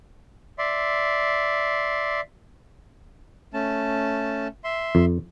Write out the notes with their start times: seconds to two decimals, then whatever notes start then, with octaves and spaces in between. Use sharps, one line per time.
0.58 D5 E5 C6
3.54 A3 C#4 A5
4.64 E5 C6
4.95 F2